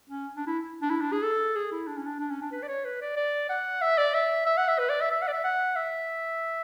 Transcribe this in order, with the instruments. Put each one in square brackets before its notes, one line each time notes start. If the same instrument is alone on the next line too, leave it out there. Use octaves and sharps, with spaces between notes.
[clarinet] C#4
D4
E4
D4
E4
D4
G#4
A4
G#4
E4
D4
C#4
D4
D4
C#4
D4
B4
D5
C#5
B4
D5
D5
F#5
E5
D5
E5
E5
F#5
E5
B4
D5
E5
E5
F#5
D5
E5
F#5
E5